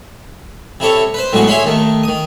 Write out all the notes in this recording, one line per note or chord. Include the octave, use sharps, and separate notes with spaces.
C3 E4 A4 C#5
B4 C5
A2 F#3 G#3 B3 F#4
E4 G#4 C#5 E5 B5 C6
D#2 D#3 A3
D#3 D#6